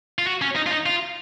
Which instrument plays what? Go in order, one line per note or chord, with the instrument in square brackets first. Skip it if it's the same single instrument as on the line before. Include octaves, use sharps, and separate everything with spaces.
[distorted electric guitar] F4
F#4
C#4
D#4
F4
D#4
F4